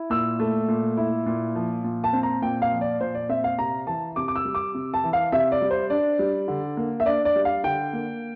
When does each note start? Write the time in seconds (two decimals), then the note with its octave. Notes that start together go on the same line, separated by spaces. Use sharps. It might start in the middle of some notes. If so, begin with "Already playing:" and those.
Already playing: E4
0.10 A#2 E6
0.39 A3
0.68 A#2
0.97 E4
1.26 A#2
1.55 F3
1.84 A#2
2.04 A5
2.13 C4
2.23 A#5
2.42 A#2 G5
2.62 F5
2.71 F3
2.81 D5
3.00 A#2 C5
3.15 D5
3.29 C4 E5
3.44 F5
3.58 C3 A#5
3.87 E3 A5
4.16 C3 D6
4.28 D6
4.36 E6
4.45 G3
4.55 D6
4.74 C3
4.94 A5
5.04 E3
5.13 F5
5.32 C3 E5
5.52 D5
5.61 G3
5.71 C5
5.90 D4 D5
6.19 G3
6.48 D3
6.77 A#3
7.00 E5
7.06 D4 D5
7.25 D5
7.35 G3
7.45 F5
7.64 D3 G5
7.93 A#3